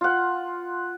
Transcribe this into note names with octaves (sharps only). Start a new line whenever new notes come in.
F4 F#5